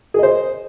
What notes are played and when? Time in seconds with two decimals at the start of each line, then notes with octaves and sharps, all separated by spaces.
0.14 G#4
0.19 D#5
0.23 C5